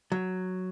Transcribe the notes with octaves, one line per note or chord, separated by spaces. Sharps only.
F#3